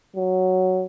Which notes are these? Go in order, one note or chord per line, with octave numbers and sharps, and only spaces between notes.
F#3